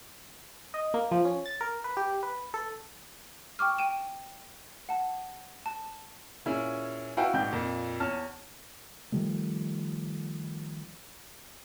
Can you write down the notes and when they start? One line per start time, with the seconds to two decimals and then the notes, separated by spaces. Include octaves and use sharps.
0.74 D#5
0.94 A#3
1.11 F3
1.25 C#4
1.46 A6
1.61 A#4
1.84 B4
1.97 G4
2.23 B4
2.54 A4
3.59 G5 C#6 D6 F6
3.78 G5 D#7 E7
4.89 F#5 A5
5.66 A5
6.46 A#2 C#4 E4 G#4
7.17 E4 F#4 B4 F5 G5
7.33 A#1 G#2 F#4 G5 G6
7.52 F2 A#2
8.00 E2 C#5 A5 F6
9.12 D#3 F3 G3 A3